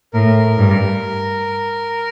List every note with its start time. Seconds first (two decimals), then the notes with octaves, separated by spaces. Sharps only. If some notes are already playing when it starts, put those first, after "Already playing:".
0.13 A2 A#4
0.58 G2